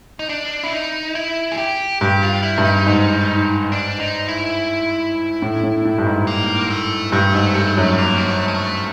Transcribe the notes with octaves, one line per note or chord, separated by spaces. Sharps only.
D#4
D4
E4
D#4
E4
G#4
G4
G2 G4
F4
E4
G2
D#4
G#2
D4
D#4
E4
A2
A2
A2
G2
G#2
A#3
A3
G2 A3
G#2
G2
F#2
A#3
G#3
A3
G#3
A3